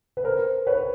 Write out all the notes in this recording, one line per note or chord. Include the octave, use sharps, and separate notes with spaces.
B4
A#4 C5
B4 C#5